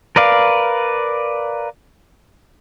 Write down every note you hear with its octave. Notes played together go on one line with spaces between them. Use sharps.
A#4 B4 D5 F5